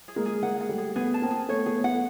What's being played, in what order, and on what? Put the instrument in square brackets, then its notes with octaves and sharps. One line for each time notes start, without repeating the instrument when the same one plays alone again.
[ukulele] G#4
[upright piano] G#3 A#3
[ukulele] G#4
[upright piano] G#3 A#3 [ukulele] F#5
[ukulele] F#5
[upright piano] G3 A3
[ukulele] G#4
[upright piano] A3 B3 [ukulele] G#4
[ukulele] A5
[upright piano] A#3 C4
[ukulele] G#4
[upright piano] A3 B3 [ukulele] C#5
[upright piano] A3 B3 [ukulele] G#4
[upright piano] A3 B3 [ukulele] F#5